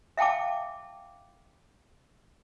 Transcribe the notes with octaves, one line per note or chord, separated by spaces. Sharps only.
E5 F5 G5 A5 D6